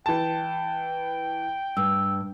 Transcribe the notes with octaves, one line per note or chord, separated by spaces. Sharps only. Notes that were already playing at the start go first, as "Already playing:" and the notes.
E3 G5 A5
G2 E6